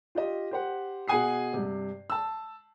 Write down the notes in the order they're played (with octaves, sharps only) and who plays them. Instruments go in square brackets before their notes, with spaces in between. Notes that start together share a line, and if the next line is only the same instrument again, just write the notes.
[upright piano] F4 G4 D#5
G4 C5 F#5
B2 G#4 F#5 G#5 D#6 C7
G2 C3
A5 E6